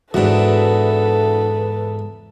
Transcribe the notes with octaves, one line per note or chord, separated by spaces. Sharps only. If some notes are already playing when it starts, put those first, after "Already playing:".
E2 G#2 D4 E4 F#4 A4 B4